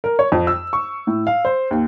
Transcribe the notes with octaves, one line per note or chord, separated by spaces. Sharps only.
A#4
C#5
F2
E6
C#6
A2
F5
C5
D#2